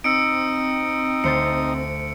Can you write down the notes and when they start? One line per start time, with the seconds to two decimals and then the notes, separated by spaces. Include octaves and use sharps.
0.04 C4 D#4 E6 C#7 D7
1.24 D2 C5 A6 C#7